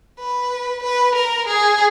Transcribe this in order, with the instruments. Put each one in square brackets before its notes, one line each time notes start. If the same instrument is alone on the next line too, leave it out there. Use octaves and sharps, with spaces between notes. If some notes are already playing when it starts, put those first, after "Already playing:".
[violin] B4
B4
A#4
G#4